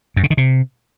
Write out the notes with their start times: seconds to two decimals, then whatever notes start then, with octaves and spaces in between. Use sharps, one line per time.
0.16 F#2
0.23 C#3
0.30 D#3
0.37 C3